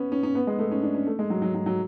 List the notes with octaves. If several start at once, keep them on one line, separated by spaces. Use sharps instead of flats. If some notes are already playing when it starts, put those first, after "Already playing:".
Already playing: B3 C#4
C#4
C#4
B3
G#3
A3
C#4
D4
C#4
A3
G#3
F#3
F#3
F#3
F#3